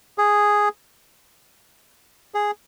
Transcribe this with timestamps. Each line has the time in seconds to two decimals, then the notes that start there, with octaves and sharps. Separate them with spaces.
0.18 G#4
2.34 G#4